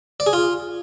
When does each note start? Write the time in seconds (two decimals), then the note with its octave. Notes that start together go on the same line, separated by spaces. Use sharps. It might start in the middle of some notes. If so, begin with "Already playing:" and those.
0.20 D5
0.27 G#4
0.33 F4